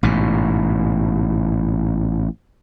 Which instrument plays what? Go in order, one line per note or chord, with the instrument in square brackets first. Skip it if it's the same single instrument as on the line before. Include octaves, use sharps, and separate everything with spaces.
[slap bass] A1 G#2 B2